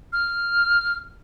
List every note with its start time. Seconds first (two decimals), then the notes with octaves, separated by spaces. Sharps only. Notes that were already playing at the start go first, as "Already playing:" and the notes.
0.13 F6